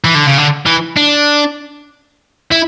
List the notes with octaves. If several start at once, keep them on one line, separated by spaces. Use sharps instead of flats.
E3
D3
C#3
D3
E3
D4
E4